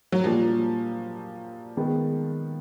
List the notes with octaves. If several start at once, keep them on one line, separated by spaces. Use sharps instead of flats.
F#3
A#2 F3 G3 A#3 D4
D#3 G#3 B3